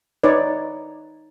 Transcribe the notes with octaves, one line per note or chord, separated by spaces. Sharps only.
D#4 B4 C#5 D5